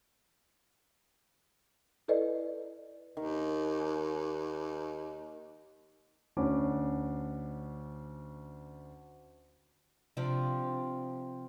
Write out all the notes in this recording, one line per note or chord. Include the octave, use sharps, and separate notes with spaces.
E4 A4 B4 D5 D#5
D#2 D#3
D2 C#4 D4 D6
C3 F3 D4